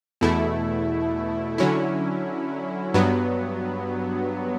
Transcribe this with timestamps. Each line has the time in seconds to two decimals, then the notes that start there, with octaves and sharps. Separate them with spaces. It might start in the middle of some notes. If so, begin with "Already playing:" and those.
0.21 E2 B2 A3 E4
1.58 D3 F#3 C#4 E4
2.94 G2 F#3 B3